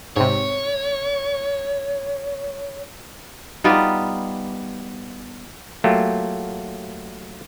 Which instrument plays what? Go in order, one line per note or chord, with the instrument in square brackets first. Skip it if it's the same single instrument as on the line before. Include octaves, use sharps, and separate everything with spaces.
[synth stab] G#2 C3 [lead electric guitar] C#5
[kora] G3 B3 D#4 F4
[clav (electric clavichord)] F#3 A3 A#3 F4 G4